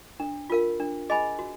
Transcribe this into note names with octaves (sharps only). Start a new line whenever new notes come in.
D4
F4 A#4 F5
D4
G#4 D#5 G#5 B5
F#4